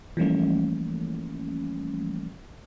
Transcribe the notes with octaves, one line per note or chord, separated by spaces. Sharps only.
E3 F3 G3 A3 A#3 C#4